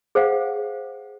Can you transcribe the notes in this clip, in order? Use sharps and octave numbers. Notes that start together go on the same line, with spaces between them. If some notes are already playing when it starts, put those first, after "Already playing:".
G#4 C5 F5 F#5